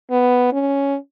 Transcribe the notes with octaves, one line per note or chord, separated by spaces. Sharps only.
B3
C#4